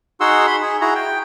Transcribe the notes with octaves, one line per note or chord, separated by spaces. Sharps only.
D#4 F#4 G#4 F#5 C6 E6
B5 C6
G#4
E4 F#4 G#4 A#5
G5